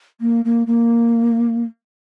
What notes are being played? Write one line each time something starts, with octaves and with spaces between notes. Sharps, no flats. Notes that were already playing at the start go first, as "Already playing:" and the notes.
A#3
A#3
A#3